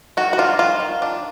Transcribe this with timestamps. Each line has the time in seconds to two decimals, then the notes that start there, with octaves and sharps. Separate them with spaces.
0.17 D#3 F#4
0.33 F#4
0.38 D4 F4
0.59 D#3 F4
0.80 D#3
1.02 D4